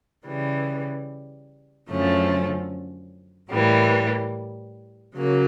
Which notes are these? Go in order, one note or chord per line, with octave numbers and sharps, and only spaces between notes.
C#3 E3 G3
F#2 D3 F3 A3 C#4
A2 E3 G3 A#3
C#3 F#3 A#3